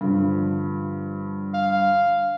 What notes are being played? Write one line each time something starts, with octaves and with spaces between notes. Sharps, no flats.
G2 D3 F3
F5